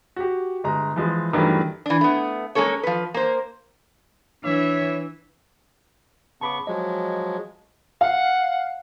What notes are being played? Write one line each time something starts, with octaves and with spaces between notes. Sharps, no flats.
F#4 G4
G1 G#3 A#5
E3 F3 G#3
G2 D#3 E3 F#3 G3 A3
E3 D4
A3 B3
G#3 A#3 C#4 A4 C#5
F3 B4
A#3 C5
E3 D4 C#5 E5
C#3 B3 A5 B5 C#6 D6
F3 F#3 G#3 D#5
F5 F#5